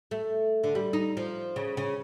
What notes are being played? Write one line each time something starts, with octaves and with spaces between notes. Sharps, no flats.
A3
D3
G3
D#4
F3
C#3
C#3